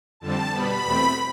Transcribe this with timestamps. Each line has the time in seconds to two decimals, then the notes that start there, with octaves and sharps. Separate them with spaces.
0.20 F2 D3 G3 C4 A5
0.52 B2 G3 B3 B5
0.84 E2 B2 A3 C4